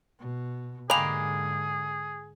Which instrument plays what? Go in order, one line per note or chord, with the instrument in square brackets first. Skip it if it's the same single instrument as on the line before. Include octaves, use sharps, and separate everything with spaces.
[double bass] B2
[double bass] G#2 D3 [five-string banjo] G#3 A#3 G4 [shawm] G#4 [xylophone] B5 F7